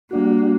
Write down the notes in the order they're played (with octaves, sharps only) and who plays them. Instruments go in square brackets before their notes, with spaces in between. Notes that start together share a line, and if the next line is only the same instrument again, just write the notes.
[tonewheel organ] G3 D4 F#4 [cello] A#3